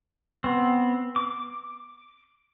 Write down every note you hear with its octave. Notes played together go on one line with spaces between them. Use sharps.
B3 C4
D6